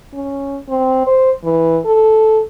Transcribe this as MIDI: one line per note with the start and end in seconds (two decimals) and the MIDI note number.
0.13 0.58 61
0.69 1.06 60
1.07 1.31 72
1.44 1.78 52
1.85 2.41 69